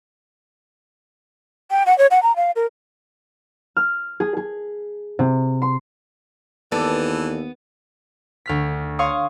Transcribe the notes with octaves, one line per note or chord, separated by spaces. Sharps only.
G5
F#5
C#5
F#5
A#5
F5
A#4
F6
G#4
G#4
C3
C6
D#2 E3 B3 A4 D5
D2 F6 B6
C#5 F5 C6 C#6 D#6